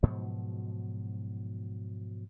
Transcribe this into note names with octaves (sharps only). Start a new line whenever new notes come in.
G#2 B2 F3 F#3